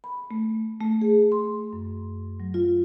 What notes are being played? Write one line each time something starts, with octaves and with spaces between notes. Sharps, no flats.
B5
A3
A3
G#4
C6
F#2
F#3
F4